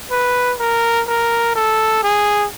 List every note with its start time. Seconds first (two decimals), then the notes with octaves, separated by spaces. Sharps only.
0.11 B4
0.59 A#4
1.07 A#4
1.55 A4
2.03 G#4